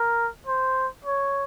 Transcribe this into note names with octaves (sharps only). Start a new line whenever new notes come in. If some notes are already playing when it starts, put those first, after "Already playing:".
Already playing: A#4
C5
C#5